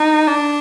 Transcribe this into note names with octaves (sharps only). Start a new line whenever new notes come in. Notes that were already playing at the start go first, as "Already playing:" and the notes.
Already playing: D#4
D4